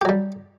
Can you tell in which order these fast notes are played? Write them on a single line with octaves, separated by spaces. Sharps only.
G4 F#3 G3